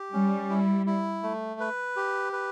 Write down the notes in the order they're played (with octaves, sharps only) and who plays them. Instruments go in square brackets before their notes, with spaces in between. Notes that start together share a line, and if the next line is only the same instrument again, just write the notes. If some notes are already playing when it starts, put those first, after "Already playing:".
Already playing: [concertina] G4
[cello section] G3 [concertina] C#4
[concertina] E4
E4
A3
B4
G4
B4